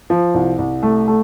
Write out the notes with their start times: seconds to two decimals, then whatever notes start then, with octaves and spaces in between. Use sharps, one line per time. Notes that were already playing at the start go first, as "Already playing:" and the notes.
0.10 F3
0.34 C2
0.58 C2
0.83 A3
1.08 A3